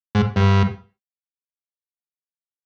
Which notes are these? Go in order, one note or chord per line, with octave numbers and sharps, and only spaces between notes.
G#2
G2